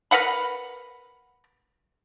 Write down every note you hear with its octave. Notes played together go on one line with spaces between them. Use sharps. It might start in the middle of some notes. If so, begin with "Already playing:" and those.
A#4 B4 F#5 B5